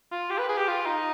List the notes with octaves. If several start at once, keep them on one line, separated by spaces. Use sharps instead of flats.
F4
G4
B4
G#4
G4
F4
D#4